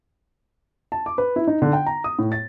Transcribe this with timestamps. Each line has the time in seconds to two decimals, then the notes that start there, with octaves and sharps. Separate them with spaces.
0.92 A5
1.06 D6
1.18 B4
1.36 E4
1.47 D#4
1.62 D3
1.73 G5
1.86 A#5
2.04 D#6
2.19 A2
2.32 A6